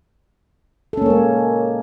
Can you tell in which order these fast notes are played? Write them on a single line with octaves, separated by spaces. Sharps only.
A4 C#4 A#3 C#5 G#3